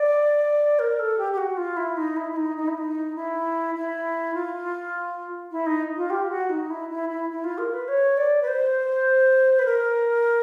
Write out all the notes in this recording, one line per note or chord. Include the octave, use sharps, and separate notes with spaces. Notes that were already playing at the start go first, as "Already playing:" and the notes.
Already playing: D5
A#4
A4
G4
G4
F#4
F4
E4
D#4
E4
E4
D#4
D#4
E4
D#4
E4
E4
F4
E4
D#4
F4
G4
F#4
D#4
E4
E4
E4
E4
F4
A#4
B4
C#5
D5
B4
C5
B4
A#4